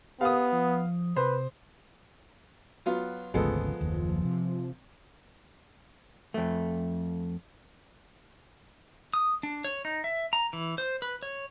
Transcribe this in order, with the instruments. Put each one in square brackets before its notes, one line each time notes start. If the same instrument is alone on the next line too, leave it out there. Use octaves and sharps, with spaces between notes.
[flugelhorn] B3 [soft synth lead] G4 [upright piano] F5 D#6
[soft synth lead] F3
[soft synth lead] C3 [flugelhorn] B4 [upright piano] C5
[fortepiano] F#3 B3 F4
[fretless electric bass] G#1 D2 C#3 [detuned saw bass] F3 [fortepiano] G#3 B3 A4
[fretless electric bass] F#1 D#2
C3
[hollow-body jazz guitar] F2 A3
[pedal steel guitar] D#6
D4
C#5
D#4
E5
A#5
E3
C5
B4
C#5